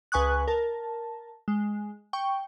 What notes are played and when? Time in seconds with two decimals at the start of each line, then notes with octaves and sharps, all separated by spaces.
0.12 C#2 B4 G#5 C#6 D#6 F#6
0.48 A#4 A5
1.48 G#3
2.13 G5 C#6